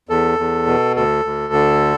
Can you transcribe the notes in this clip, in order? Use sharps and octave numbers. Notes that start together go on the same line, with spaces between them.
E2 A4
E2
B2
D2 A4
D2
D3